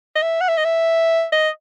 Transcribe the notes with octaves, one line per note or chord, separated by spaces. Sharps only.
D#5
E5
F#5
E5
D#5
E5
D#5